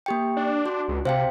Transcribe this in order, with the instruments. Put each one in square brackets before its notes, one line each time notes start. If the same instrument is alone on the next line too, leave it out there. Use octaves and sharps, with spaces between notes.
[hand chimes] A#3 G4 G5
[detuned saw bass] D4
[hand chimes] F#4
[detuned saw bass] C#2
[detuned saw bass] C3 [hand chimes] C5 F5 G5